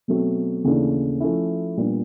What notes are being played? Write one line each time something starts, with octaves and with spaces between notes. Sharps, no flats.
B2 F#3 A3 C4
D#2 C#3 E3 A3 D4
F3 A3 C#4 E4
A#2 G3 B3 D4